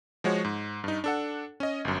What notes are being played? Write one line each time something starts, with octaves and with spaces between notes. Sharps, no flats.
F3 G#3 F#4 C#5
G#2
G2 D#4
D4 A4 F#5
C#4 D#5
G1 F#2